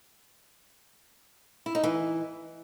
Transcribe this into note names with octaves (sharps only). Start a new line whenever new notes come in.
E4
D#4
E3